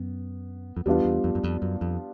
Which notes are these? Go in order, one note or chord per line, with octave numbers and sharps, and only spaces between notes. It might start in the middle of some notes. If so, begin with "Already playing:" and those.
Already playing: F#2 B3
F2
E2 G3 B3 D4 F4
E2
F2
F#2
F2
F#2
F2